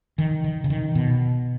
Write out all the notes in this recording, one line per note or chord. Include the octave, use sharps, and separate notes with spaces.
D#3
D#3
C#3
D#3
B2